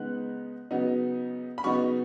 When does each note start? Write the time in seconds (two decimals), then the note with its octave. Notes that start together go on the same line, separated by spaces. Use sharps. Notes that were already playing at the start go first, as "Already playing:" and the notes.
Already playing: C#3 G#3 B3 D#4 F#6
0.71 C#3 F#3 B3 D#4
1.58 B5
1.64 C#3 F#3 B3 D#4 C#6